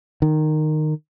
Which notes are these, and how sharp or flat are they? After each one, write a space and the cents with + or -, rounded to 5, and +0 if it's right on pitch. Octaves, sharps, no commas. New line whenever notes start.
D#3 -15